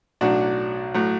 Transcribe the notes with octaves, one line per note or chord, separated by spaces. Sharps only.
B1 A2 F#3 D4 F#4
A2 F#3